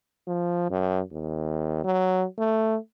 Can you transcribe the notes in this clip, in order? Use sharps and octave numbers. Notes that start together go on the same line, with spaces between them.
F3
F#2
D#2
F#3
A3